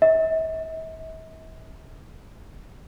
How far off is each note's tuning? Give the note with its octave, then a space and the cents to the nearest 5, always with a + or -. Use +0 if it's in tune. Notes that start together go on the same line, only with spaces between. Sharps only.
E5 -45